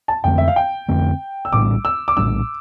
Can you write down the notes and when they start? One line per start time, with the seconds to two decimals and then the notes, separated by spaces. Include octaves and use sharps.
0.08 A5
0.24 F2 D3 A3 C4 G5
0.38 E5
0.48 F5
0.56 G5
0.88 F2 D3 A3 C4
1.45 E6
1.53 A#1 A2 G3 D4 D6
1.85 E6
2.08 D6
2.17 A#1 A2 G3 D4 E6